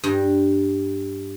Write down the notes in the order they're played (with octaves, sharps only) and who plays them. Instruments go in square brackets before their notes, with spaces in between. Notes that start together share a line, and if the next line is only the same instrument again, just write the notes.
[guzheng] G2